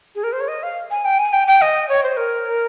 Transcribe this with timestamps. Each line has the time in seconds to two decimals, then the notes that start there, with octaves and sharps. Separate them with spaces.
0.15 G#4
0.23 A#4
0.32 C5
0.40 C#5
0.48 D#5
0.63 F5
0.91 G#5
1.05 G5
1.19 G#5
1.33 G5
1.47 G5
1.61 D#5
1.89 C#5
2.03 C5
2.17 A#4